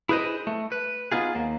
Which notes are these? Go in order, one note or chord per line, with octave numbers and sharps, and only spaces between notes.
E4 G#4 B4 C5 D#5
A3
B4
B3 D#4 F4 G#4
D#2 A#3